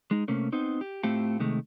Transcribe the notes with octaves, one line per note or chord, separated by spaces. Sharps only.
G#3 D#4
C3 A3 A#3 C#4
B3 C4 D#4 C5
G4
A2 A3 C4 F4 G4 A4
C3 D#3 G#3 A3